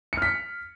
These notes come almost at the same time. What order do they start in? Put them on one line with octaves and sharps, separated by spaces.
C#7 F6 B6